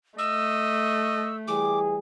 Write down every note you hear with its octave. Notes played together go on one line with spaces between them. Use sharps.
A3 D#5 E6
E3 G3 G#4 D6